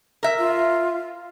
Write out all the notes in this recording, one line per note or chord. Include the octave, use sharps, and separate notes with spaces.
A#4 E5
F4